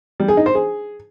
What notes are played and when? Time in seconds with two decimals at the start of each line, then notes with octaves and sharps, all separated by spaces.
0.20 G3
0.28 G#4
0.37 D#4
0.46 C5
0.55 G#4